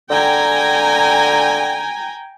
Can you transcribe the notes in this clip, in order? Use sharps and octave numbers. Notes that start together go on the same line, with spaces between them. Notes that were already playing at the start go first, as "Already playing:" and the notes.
D3 G5 G#5 A#5